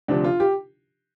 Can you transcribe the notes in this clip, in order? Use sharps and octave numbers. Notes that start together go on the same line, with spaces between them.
D2 C3 F3 D4
F4
G4